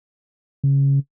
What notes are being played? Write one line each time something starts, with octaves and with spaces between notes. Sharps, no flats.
C#3